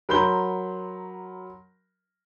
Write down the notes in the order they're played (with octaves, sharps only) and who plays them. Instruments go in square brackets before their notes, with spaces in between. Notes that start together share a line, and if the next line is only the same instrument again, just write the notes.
[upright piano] F#3 A#4 B5 C6 G6 G7